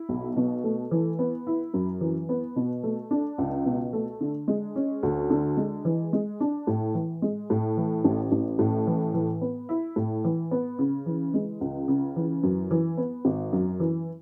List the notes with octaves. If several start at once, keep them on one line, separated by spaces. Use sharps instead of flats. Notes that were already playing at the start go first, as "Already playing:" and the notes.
Already playing: E4
B1
B2
A3
E3
B3
E4
F#2
E3
B3
B2
A3
D4
C#2
B2
A3
D3
G#3
C#4
D2
D3
G#3
E3
G#3
D4
A2
E3
G#3
A2
E3
A1
A1
A2
E3
E3
B3
E4
A2
E3
B3
C#3
E3
G#3
C#2
C#3
E3
F#2
E3
B3
G#1
F#2
E3